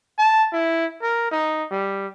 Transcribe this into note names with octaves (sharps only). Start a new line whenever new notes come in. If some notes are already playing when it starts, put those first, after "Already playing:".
A5
E4
A#4
D#4
G3